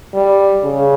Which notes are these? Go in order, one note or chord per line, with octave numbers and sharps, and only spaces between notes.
G3
C#3